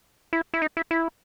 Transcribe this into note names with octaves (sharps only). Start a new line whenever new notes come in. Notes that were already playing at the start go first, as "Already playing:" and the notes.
E4
E4
D#4
E4
E4